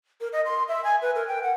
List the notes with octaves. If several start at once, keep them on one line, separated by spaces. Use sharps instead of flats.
A#4
D#5
C6
E5
G#5
B4
A#4
G5
F#5